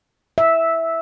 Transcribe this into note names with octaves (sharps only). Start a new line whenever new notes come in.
E5